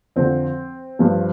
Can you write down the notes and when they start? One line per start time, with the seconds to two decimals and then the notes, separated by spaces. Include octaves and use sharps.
0.16 F2 D3 F3 C4
0.99 G2 F3